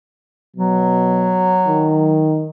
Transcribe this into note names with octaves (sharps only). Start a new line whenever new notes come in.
B2 F#3
D#3